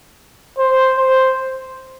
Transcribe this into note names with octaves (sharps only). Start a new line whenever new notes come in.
C5
C5